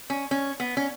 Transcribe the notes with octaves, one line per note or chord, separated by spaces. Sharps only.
C#4
C#4
B3
C#4